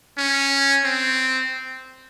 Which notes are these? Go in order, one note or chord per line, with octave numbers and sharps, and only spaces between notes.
C#4
C4